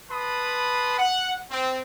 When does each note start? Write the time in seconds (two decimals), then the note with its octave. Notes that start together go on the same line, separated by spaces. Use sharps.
0.10 B4 A5 B5 C6 D#6
0.98 F#5
1.50 C4